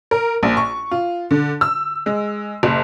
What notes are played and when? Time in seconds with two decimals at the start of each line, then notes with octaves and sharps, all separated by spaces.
0.11 A#4
0.43 A#1
0.57 C#6
0.91 F4
1.31 D3
1.61 E6
2.06 G#3
2.63 F#1